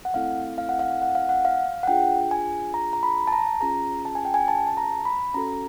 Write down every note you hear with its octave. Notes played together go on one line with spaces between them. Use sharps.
F#5
A3 C4 E4 A4 F5
F5
F#5
F5
F#5
F5
F#5
F5
F#5
D4 F4 G#4 G5
G#5
A#5
A#5
B5
A5
A#5
C#4 F4 G#4 A#5
A5
G#5
G5
G#5
A5
A5
A#5
B5
C#4 F#4 A4 A#5